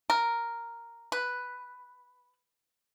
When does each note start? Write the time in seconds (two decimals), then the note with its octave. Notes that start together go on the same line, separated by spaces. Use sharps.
0.10 A#4
1.12 B4